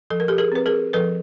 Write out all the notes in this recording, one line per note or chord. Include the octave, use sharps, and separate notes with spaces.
F3 A4
A#4
G4 A4
G#4 A#4
C4 B4
G#4 A#4
F3 A4 B4